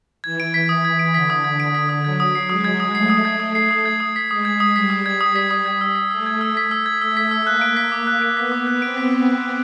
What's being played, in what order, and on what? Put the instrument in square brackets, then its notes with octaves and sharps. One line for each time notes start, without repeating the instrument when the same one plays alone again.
[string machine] E3 [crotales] G#6
[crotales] D7
B6
D#6
G#6
D7
[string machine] D3 [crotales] B6
[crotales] D#6
G#6
D7
B6
D#6
[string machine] F#3 [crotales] G#6
[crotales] D#6
C7
[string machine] G#3 [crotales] D#6
[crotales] G#6
D#6
[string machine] A3 [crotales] C7
[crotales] D#6
G#6
D#6
C7
D#6
G#6
D#6
B6
[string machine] G#3 [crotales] D#6
[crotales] G#6
D#6
[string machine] G3 [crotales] B6
[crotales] D#6
G#6
D#6
B6
D#6
G#6
E6
B6
[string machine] A3 [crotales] E6
[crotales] G#6
E6
B6
E6
G#6
[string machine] A3 [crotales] E6
[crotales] B6
E6
[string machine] A#3 [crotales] F#6
[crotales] D7
B6
D6
F#6
D7
[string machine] B3 [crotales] B6
[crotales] D6
F#6
[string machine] C4 [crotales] D7
[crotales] B6